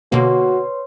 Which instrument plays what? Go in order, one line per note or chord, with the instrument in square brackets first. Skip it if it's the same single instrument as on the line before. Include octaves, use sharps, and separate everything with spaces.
[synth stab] B2 D3 A#3 [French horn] F#4 [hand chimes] B4 C#5 C6